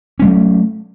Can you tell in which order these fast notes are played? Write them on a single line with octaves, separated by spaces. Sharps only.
C#4 G#3 F#3 A3